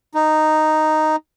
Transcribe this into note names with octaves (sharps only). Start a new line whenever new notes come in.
D#4